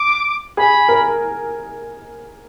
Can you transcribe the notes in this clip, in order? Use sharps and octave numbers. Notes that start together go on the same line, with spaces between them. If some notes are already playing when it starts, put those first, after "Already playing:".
Already playing: D6
G#4 B5
A#4